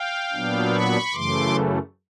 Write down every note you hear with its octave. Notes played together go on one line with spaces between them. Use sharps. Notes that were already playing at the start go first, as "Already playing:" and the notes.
Already playing: F5 G5
A#2 F#3 B3 D4
B5 C#6
F#2 C#3 E3 A3 C6 D6